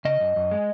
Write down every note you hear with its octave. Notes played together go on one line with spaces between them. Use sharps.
C#3 D#5
F#2
F#2
G#3